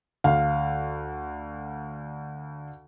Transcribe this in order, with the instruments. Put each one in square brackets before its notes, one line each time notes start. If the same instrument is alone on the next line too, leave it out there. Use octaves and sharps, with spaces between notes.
[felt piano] D2 F5